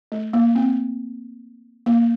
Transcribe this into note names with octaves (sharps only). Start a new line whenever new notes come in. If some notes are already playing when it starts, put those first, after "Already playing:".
A3
A#3
C4
A#3